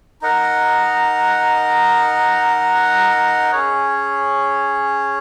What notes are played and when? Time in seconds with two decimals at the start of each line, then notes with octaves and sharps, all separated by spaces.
0.21 D#4 A#4 D#5 F#5
3.52 C#4 G#4 C#5